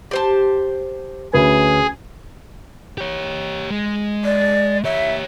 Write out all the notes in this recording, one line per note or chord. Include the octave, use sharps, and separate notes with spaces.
G4 C5 A5
D2 C#4 G#4 B4
G4 C#5
G#3
D5
G4 C#5 E5